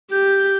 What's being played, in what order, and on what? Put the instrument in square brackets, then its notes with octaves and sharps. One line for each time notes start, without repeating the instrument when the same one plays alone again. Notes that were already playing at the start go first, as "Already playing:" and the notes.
[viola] G4 [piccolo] G6